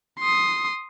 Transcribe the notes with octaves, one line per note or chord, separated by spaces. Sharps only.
C6 D#6